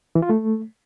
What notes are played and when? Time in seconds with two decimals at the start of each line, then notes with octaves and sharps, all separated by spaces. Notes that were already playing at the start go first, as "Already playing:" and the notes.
0.15 E3
0.22 F4
0.29 A3